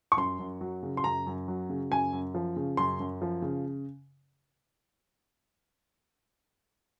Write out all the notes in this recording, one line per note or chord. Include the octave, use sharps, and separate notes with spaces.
C#6
F#2 C6
F#2
F#3
C#3
C6
F#2 A#5
F#2
F#3
C#3
F#2 G#5
F#2
F3
C#3
F#2 C6
F#2
F3
C#3